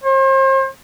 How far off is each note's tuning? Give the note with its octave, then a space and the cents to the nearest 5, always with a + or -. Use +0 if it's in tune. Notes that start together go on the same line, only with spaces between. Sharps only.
C5 +40